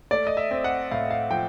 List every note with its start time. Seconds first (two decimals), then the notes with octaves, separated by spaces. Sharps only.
0.11 A3 D5
0.27 D#5
0.37 E5
0.51 C4
0.64 F#5
0.91 A2 F5
1.10 F5
1.31 F3 G5